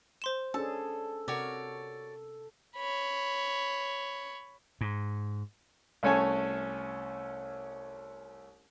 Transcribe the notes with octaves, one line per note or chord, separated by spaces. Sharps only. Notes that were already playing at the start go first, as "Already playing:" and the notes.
C5 C6 E7
C#4 D4 G#4 A4 A5
C3 F#4 A#4 C#5 D5
C#5 B5
G#2
C2 A3 C#4 A4 C#5 G#5